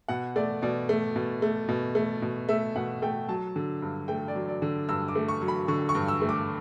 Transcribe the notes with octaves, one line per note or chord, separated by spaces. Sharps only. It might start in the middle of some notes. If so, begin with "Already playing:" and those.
B2 F#5
A3 D5
B2 D5
A3
B2
A3
B2
A3
B2
A3 E5
B2 F#5
A3 G5
F#3 A5
D3
G2
A3 G5
D5
F#3
D5
D3
G2 E6
D6
A3
C#6
F#3
B5
D3 C#6
C#6
G2
E6
A3
D6